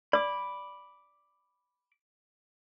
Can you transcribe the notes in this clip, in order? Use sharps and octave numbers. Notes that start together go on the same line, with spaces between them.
D5 B5 D6